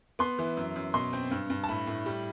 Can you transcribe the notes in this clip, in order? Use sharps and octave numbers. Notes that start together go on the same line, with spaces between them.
B3 C6
E3
F#2
F#2
B2 C6
C4
G2
G2
A5
A2 B5
A2
G3